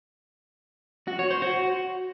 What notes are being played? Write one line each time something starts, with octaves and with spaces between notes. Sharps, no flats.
F#4
C#5
C5
F#4